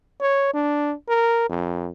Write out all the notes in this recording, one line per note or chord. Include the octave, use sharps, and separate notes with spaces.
C#5
D4
A#4
F2